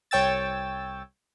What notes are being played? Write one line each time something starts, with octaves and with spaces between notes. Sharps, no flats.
C2 C#5 G5 E6 A6